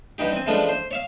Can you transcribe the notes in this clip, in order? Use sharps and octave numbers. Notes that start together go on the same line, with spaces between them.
G2 E3 D#4 G4
C4 G#5
E3 F3 G#3 A3 C#4 D4
C5
C#5 E5 F5